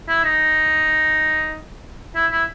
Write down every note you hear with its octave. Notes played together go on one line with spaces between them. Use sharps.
E4
D#4
E4
E4